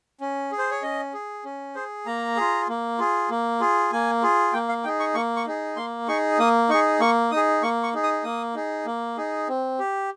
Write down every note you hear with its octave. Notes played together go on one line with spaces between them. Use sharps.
C#4
G#4
C5
C#5
C#4 D#5
G#4
C#4
G#4 C5
A#3 A#5
F4 G#4
A#3
F4 G#4
A#3
F4 G#4
A#3 G#5
F4 G#4
A#3 G5
F5
D#4 G#4 G5
C#6
A#3 C#6
C#6
D#4 G#4
A#3 C6
D#4 G#4 C#6
A#3 D#6
D#4 G#4 C#6
A#3 C#6
D#4 G#4 D#6
A#3 C#6
C#6
D#4 G#4
D#6
A#3 D#6
D#4 G#4
A#3
D#4 G#4
C4
G4